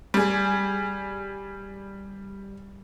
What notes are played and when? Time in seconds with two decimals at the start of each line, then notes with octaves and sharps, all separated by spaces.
0.14 G3 G#4